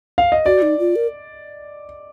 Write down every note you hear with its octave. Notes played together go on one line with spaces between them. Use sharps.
F5
D#5
F#4 D5
D#4
F4
A#4